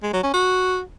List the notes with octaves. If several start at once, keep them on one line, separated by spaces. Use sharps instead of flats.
G#3
F#3
C#4
F#4